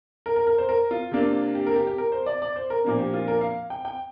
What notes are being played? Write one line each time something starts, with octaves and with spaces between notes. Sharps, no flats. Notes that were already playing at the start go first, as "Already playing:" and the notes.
A#4
A#4
A#4
C5
A#4
F4
C3 A#3 D4
G4
A#4
G4
G4
A#4
C5
D5
D5
C5
A#4
A#2 F3 A#3 D4
G4
F4
A#4
F5
G5
G5